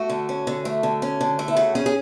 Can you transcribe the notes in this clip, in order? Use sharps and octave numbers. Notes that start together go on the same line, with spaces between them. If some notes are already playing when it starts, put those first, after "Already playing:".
Already playing: A3 F#4
D3
C#4
D3
A3
D3
C#4
D3
A3
E4
C#3 F#4
C#4 G#4
G#4